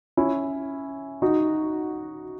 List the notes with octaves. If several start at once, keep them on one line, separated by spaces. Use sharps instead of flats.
C#4 E4
D#4 F#4